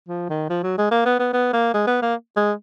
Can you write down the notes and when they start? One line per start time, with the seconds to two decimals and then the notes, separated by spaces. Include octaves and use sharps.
0.08 F3
0.29 D#3
0.50 F3
0.63 F#3
0.78 G#3
0.91 A#3
1.06 B3
1.19 B3
1.33 B3
1.53 A#3
1.74 G#3
1.87 B3
2.02 A#3
2.36 G#3